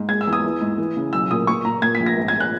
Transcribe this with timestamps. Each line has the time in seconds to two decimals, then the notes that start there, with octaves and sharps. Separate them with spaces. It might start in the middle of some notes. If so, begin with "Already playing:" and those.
Already playing: G#2
0.09 G#3 G#6
0.21 E6
0.27 E2
0.33 D#6
0.44 E3
0.61 G#2
0.78 E3
0.97 C#3
1.13 B1 E6
1.31 A#2 D#6
1.47 A#2 C#6
1.65 A#2 A#5
1.82 A#2 G#6
1.95 B6
2.00 A#1
2.06 A#6
2.17 G#1
2.28 G#6
2.40 F#6